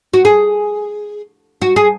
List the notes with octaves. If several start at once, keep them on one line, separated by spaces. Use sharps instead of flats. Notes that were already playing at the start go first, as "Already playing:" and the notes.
F#4
G#4
F#4
G#4